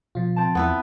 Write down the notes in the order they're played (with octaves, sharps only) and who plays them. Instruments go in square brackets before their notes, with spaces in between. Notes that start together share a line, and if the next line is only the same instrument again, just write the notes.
[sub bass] B2 [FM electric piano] F3 F4
[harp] C4 A5
[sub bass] E2 [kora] B3 E4 B4